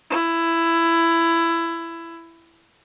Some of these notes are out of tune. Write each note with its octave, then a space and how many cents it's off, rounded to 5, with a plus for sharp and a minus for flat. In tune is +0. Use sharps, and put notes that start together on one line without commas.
E4 +15